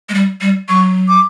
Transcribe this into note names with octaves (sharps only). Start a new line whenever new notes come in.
G#3
G3
G3
F#3 C#6
D6